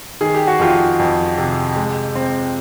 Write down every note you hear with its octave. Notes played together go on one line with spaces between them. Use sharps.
D#3 G#4
G4
F#4
F2 F4 G4
F2
C3
G#3
C4